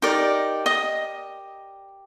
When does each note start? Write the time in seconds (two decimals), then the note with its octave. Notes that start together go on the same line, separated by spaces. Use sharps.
0.02 D#4 G4 A#4 D5
0.66 D#5 D#6